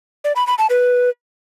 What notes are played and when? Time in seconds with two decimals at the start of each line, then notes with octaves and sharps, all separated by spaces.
0.24 D5
0.36 B5
0.47 B5
0.58 A5
0.70 B4